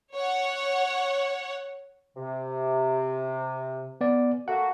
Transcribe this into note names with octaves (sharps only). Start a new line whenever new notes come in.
C#5 F#5
C3
B3 D5
A3 A#3 F#4 F#5